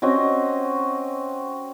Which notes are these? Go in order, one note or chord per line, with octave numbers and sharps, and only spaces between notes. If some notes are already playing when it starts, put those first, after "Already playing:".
C4 C#4 F#4 D#5